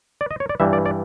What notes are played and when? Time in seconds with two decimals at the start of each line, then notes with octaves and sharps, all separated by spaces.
0.21 D5
0.31 D#5
0.40 C#5
0.49 D5
0.60 G2 E3 G3 E5
0.73 D5
0.86 D5